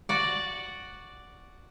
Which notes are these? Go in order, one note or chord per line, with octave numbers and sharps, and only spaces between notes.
F#4 D5